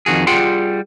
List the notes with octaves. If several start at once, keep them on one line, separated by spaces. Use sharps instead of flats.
F2 D#3 F#4 G#4
G3 F4 G#4 F#5 G5 C6